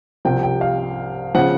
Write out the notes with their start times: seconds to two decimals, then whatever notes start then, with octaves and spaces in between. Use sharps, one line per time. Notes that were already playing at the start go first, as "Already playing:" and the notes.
0.25 C2 C3 F3 G5
0.43 G5
0.61 F5
1.35 C#3 F3 F#5